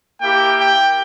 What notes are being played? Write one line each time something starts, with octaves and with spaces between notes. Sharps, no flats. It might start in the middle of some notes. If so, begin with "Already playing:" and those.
A#3 E4 G4 G5
G5